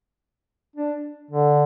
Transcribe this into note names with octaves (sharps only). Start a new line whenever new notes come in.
D4
D3